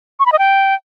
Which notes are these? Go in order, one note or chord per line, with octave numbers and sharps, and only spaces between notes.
C#6
B5
D#5
G5